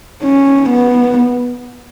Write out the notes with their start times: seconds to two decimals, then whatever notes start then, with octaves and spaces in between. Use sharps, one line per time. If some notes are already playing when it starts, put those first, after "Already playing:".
0.23 C#4
0.70 B3